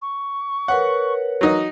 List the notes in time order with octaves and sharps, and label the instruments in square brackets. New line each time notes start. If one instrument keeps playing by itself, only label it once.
[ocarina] C#6
[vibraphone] A#4 B4 C#5 [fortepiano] F#5
[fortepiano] F#3 D#4 D#5